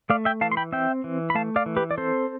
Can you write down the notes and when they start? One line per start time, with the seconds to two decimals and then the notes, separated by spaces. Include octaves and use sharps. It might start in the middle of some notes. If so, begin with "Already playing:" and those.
0.10 A3 D5 F5
0.25 E5 G5
0.41 E3 F5 A5
0.52 C6
0.57 G5 B5
0.72 C4 E5 G5
1.04 E3
1.30 B5
1.35 A3 F5 A5
1.56 D5 F5
1.66 E3
1.76 G4 B4
1.91 D5
1.98 C4 A4 C5